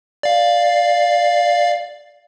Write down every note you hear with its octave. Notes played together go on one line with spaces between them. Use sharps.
D5 F5